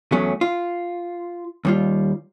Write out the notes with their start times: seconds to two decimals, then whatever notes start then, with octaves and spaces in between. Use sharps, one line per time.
0.12 E2 F#3 A3 C#4
0.41 F4
1.65 D#2 G3 F4